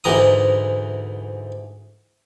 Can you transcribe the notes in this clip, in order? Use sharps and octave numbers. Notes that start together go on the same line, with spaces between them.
D2 G#2 E3 A#5 D#6